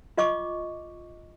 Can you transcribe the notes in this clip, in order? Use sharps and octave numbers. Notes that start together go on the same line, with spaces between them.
F4 D#5 C#6 D6